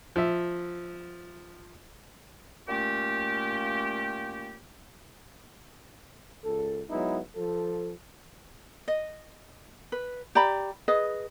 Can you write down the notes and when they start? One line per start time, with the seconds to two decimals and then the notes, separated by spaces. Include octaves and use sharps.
0.16 F3 E5
2.69 A#2 A3 A#3 C#4 G4
6.44 C#2 A4
6.90 F#3 G#3 B3 D#4 E4
7.36 F3 A4
8.88 D#5
9.92 B4
10.35 G4 D5 A#5 B5
10.88 G#4 B4 D#5